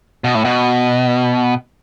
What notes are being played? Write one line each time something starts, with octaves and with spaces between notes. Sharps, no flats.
B2
A2
B2